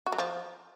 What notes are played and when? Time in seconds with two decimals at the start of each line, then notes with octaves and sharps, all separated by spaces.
0.06 F#4
0.12 F#3
0.18 F3